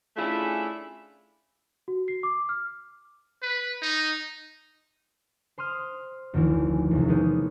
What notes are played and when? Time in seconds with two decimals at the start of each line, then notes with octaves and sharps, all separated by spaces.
0.17 A3 C#4 D4 E4 F4 G#4
1.88 F#4
2.08 C7
2.23 D6
2.49 F6
3.42 B4
3.82 D#4
5.58 C5 C6 D#6 F6
6.33 F1 D2 D#3 E3 E4
6.91 E1 C2
7.08 G#3 A#3 B3 C#4 D#4